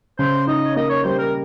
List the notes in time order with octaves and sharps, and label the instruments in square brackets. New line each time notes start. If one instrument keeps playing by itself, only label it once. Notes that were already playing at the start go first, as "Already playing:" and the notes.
[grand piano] C#3 [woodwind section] C5
[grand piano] D#4 [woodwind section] D#5
[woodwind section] C#5
[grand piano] A#3 [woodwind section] D#5
[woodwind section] C#5
[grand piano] G3 [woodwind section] C5
[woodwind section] A#4